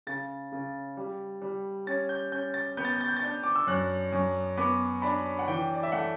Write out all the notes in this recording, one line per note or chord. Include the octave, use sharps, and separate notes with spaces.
C#3 A6
C#3
G3
G3
C#4 A6
G6
C#4 G6
A6
B3 G6
A6
G6
A6
G6
A6
D4 G6
D6
E6
F#2 F#6
F#2
B3 D6
D4 B5
F#5
E3 G5
D5
E5
A3 F#5